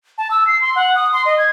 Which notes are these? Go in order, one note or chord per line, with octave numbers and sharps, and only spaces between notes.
A5
E6
C7
C6
F#5
D#6
C6
D#5
G#6